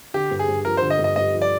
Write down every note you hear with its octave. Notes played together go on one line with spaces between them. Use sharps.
D3 G4
G2
G#4
G2
F3 A#4
C5
D3
D#5
G2
D#5
G2 D#5
F3
D5